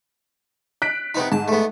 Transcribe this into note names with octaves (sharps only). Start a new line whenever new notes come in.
F#6 B6 D7
C3 B3 D#4
G#2 A5
A3 B3